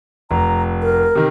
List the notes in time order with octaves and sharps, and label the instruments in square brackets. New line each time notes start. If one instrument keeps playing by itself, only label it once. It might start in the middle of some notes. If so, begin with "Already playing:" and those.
[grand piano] F1 [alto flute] A#5
[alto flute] A#4
[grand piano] C3 D#3